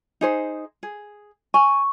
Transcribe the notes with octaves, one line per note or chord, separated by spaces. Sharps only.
D#4 G#4 C5
G#4
G#5 C#6